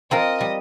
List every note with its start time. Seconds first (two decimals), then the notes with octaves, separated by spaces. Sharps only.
0.11 C4 F4 A#4 D#5
0.40 G3